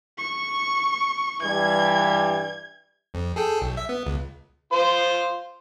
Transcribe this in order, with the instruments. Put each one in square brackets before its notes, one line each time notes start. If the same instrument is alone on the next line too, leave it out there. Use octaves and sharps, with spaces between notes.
[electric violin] C#6
[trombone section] G2 E3 G3 [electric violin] G#6
[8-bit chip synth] F2
G#4 A4 G5
B1
E5
B3
C#2
[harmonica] F4 C5